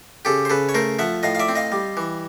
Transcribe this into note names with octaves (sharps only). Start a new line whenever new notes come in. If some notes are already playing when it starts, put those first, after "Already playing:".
C#3 G4 A4
C5
C#3 A4 B4
C#5
A3 A#4 C5
F3 E5 F#5
A2 D#5 F5
F5
D5 E5
C4
D#5 F5
G3
E3